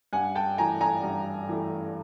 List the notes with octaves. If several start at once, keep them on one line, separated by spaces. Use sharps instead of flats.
G2 F#5 G#5
G5 A5
E3 A3 G#5 A#5
G#5 A#5
G2
E3 A3